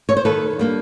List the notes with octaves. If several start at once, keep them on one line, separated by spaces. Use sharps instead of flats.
C#5
C5
D#3 A4 B4
G3 A#3 D4